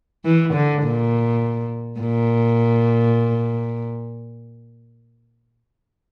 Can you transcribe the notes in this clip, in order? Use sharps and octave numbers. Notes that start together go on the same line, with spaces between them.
E3
D3
A#2
A#2